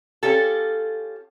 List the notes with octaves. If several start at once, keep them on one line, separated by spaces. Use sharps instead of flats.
C#4 F4 G4 A4